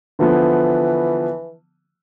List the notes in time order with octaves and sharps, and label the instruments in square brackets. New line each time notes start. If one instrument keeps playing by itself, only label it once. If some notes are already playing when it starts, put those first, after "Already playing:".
[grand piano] D3 F3 B3 [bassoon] E3